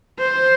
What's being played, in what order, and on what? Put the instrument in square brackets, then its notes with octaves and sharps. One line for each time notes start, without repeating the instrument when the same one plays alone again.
[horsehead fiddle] C5